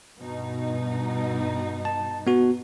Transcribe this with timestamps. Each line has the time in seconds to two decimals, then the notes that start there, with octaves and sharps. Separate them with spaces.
0.18 G2 B2 D#4
1.85 A5
2.27 B3 F#4